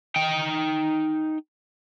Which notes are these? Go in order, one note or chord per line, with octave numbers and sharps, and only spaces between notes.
D#4 G5